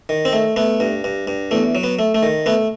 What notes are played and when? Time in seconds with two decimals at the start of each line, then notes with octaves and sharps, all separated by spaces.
0.09 D#3
0.25 C4
0.33 A3
0.56 A3 B3
0.80 G2
1.04 G2
1.27 G2
1.51 E2 A3
1.75 F#3
1.84 B3
1.99 A3
2.15 A3
2.23 D#3
2.46 A3 B3